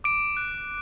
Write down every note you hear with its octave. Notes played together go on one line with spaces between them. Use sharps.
D6 D7
F#6